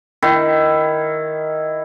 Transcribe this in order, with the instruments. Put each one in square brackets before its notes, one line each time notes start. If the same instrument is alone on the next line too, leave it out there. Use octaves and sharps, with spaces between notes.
[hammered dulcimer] D#3 E4